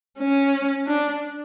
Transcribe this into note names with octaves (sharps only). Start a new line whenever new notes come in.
C#4
D4